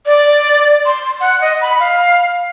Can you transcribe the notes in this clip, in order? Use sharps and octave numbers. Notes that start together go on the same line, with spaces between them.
D5
C6
F#5
D#5
B5
F5